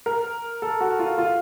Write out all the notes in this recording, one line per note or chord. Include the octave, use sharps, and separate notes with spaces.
A#4
A4
F#4
F4
F4